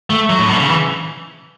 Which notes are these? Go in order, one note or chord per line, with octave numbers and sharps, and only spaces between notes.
A3
F#3
A2
B2
C#3
E3